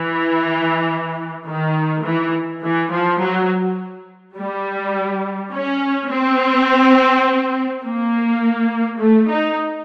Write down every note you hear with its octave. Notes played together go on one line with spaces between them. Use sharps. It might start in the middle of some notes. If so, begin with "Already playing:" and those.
Already playing: E3
D#3
E3
E3
F3
F#3
G3
C#4
C4
A#3
A3
D#4